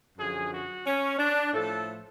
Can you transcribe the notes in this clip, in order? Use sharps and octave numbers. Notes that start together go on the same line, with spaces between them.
F#2 D3 F3 G#4
F#4
C#4
D4
A2 F3 A3 A4